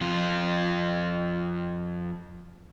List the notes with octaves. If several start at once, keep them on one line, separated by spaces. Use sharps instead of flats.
F2 F4